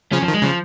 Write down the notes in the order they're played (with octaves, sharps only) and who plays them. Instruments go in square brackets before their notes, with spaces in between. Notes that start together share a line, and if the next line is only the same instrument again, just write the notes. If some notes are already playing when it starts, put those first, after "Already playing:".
[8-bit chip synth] C#3 F3 [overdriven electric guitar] C#4
[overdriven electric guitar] F3
[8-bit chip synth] D#3
[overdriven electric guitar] G#3
[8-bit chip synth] C#3 [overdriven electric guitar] F3